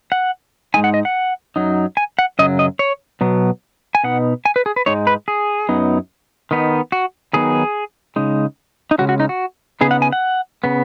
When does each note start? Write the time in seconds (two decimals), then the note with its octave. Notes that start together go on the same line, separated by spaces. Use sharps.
0.12 F#5
0.74 G#2 G#3 D#4 G#5
0.84 F#5
0.94 D#5
1.05 F#5
1.56 F#2 F#3 D#4
1.97 G#5
2.19 F#5
2.39 F#2 C#3 F#3 D#5
2.59 D#5
2.79 C#5
3.21 B2 F#3 B3
3.95 G#5
4.04 B2 B3 D#4 F#5
4.45 G#5
4.56 B4
4.66 G#4
4.76 B4
4.86 G#2 G#3 D#4 C#5
5.07 B4
5.28 G#4
5.69 F#2 F#3 B3 D#4
6.51 D#3 B3 D#4
6.92 F#4
7.33 D#3 F#3 B3 D#4 G#4
8.16 C#3 G#3 D#4
8.91 D#4
8.98 C#3 G#3 C#4 F#4
9.09 F#4
9.20 D#4
9.29 F#4
9.81 C#3 B3 D#4 G#4
9.91 F#5
10.02 G#5
10.13 F#5
10.64 C#3 B3